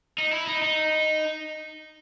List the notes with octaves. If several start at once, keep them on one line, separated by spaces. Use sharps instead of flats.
D#4
E4
D#4
D#4